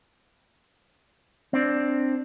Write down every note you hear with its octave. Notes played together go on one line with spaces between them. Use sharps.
C4 D4